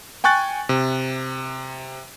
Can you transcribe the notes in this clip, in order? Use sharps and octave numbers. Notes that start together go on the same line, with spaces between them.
G5 G#5 C#6 F#6 A6
C3